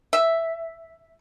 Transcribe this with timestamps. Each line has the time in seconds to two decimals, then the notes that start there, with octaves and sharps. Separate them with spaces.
0.13 E5